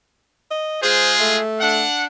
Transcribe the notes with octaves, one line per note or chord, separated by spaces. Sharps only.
D#5
G#3 F4 G#4 C5
A3
D4 F#5